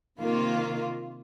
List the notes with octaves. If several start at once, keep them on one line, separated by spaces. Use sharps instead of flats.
C3 D#3 A#3 F4